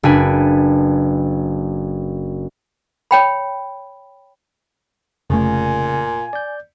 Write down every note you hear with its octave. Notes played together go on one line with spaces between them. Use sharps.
F#1 D4 B4 G#5
C#5 G5 B5
F1 A#2 C#3 A3 G#5
D5 G6